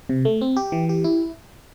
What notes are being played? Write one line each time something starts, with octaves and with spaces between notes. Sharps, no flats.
C3
A3
C4
G4
E3
G4
E4